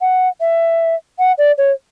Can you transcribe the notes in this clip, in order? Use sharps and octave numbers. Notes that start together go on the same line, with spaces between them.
F#5
E5
F#5
D5
C#5